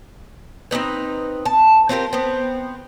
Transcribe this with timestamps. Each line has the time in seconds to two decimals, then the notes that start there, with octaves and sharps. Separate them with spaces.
0.71 C4 C#4 D#4 B4
1.45 A5
1.89 C4 F4 G4 A#4
2.13 B3 C4